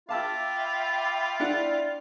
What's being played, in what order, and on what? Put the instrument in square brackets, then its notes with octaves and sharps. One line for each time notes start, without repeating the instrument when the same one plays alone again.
[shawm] F4 [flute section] E5 G5 B5 [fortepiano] F5 A5 E6 [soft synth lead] D6
[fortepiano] D4 E4 F#5 [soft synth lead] D5